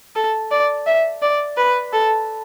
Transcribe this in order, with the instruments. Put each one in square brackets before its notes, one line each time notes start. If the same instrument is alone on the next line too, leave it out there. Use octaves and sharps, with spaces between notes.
[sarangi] A4
D5
E5
D5
B4
A4